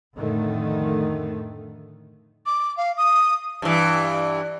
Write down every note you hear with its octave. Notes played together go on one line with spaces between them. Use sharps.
F2 A2 D3 D#3 A3
D6
F5
D#6
G2 E3